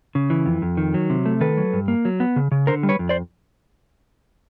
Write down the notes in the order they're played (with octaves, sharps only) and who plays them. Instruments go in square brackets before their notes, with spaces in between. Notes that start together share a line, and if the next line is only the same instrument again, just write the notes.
[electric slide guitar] C#3
E3
F2
F2
D#3
F#3
C3
A3
D#3 A4 B4
F#3
G2
A#3
F#3
B3
C#3
C#3
D3 A#4 C5
G3
B4 C#5
F2
C5 D5